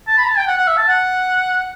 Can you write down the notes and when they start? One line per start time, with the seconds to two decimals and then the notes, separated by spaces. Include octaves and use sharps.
0.07 A5
0.17 B5
0.27 A5
0.38 G5
0.48 F#5
0.58 F#5
0.68 E5
0.77 A5
0.88 F#5